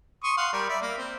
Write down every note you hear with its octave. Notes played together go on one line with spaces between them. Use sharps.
C6 C#6 D#6
F5 F#5 C6
G3 A#4 D5
D5 E5 B5
A#3
C4